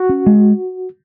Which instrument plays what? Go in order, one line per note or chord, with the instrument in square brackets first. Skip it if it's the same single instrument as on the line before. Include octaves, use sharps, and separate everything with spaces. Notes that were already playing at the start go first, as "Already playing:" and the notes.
Already playing: [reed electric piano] F#4
[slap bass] C#4
G#3